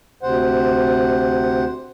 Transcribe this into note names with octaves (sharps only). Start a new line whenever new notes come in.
D2 C3 C5 F#5